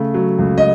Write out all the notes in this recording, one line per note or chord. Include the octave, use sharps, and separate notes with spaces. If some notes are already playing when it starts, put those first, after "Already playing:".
Already playing: C#3 A3
F#3
C#2
D#5